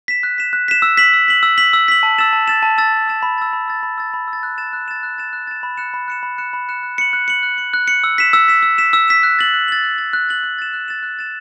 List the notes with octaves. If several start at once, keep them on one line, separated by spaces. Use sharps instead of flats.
B6 E7
F#6
B6 E7
F#6
B6 E7
E6
B6 F#7
E6
B6 F#7
E6
B6 F#7
E6
B6 F#7
A5
E6 A6 E7
A5
E6 A6 E7
A5
E6 A6 E7
A5
E6 A6 E7
B5
E6 A6
B5
E6 A6
B5
E6 A6
B5
E6
A6
F#6
A6 E7
F#6
A6 E7
F#6
A6 E7
F#6
A6 E7
B5
F#6 C#7 E7
B5
F#6 C#7 E7
B5
F#6 C#7 E7
B5
F#6 C#7 E7
F#6
C#7 F#7
F#6
C#7 F#7
F#6
C#7 F#7
F#6
C#7 F#7
E6
B6 E7
E6
B6 E7
E6
B6 E7
E6
B6 E7
F#6
A6 F#7
F#6
A6 F#7
F#6
A6 F#7
F#6
A6 F#7
F#6
A6 E7
F#6
A6 E7
F#6
A6 E7